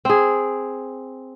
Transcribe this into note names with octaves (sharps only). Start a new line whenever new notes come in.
C4 G#4